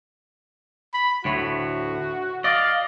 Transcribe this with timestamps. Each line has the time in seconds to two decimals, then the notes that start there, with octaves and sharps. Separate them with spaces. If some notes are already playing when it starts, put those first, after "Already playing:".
0.94 B5
1.25 D2 A2 F#4
2.44 D5 D#5 F5